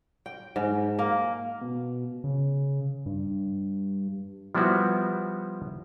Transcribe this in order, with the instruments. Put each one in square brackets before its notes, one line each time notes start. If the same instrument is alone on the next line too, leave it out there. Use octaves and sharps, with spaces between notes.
[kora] G5
G#2
A#3
[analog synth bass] B2
C#3
G2
[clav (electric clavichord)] F3 G3 B3 E4 F#4